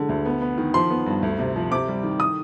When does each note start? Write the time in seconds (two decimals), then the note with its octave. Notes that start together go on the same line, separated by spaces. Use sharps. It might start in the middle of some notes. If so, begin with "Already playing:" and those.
Already playing: D3 G#3
0.09 D2
0.25 B3
0.42 B3
0.58 D#3
0.74 F3 C6
0.90 B3
1.06 G2
1.23 D2
1.39 C3
1.56 F3
1.71 C3 D6
1.88 G3
2.03 D#3
2.20 D#6